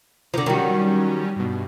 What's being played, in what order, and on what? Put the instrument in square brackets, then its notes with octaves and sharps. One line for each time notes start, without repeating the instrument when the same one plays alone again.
[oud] D3 F3 [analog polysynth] A#5
[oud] D#3 F#4 [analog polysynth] F#3 G3 C#4
[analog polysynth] G2 B2